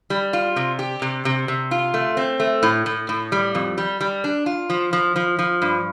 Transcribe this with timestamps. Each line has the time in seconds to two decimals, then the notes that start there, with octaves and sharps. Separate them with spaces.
0.10 G3
0.33 F4
0.56 C3
0.79 G4
1.02 C3
1.25 C3
1.48 C3
1.71 F4
1.94 A3
2.17 C4
2.40 A3
2.63 A2
2.86 A2
3.09 A2
3.32 G3
3.55 F2
3.78 G3
4.01 G3
4.24 D4
4.46 F4
4.70 F3
4.93 F3
5.16 F3
5.39 F3
5.62 G2